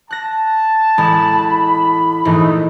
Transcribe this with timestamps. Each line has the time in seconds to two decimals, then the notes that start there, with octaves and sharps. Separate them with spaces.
0.11 A5 F#6 A#6
0.98 A1 G#3 B5
2.25 A#1 G#2 E3 A3 D#4